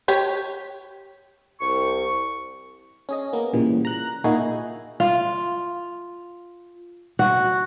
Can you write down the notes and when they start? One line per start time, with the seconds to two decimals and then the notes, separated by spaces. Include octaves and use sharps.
0.08 G4 C#5
1.61 C2 C#6
3.09 C#4 G#4 D#5
3.33 A#3 B3
3.53 A#2 C#3 E3 G3
3.85 A#5 F#6
4.24 A#2 A#3 D#4 E4 F#4 G#4
5.00 F4
7.19 F#4